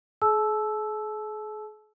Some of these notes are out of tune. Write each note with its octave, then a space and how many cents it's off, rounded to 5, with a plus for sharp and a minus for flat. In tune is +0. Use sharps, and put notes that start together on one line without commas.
G#4 +40 A5 -35 E6 +0